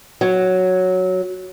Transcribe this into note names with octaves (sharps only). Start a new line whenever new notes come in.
F#3